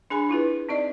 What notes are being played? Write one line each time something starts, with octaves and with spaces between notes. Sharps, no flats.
D4 G#4 G#5 B5
E4 F4 G#4 B4
C4 D#4 D5 D#5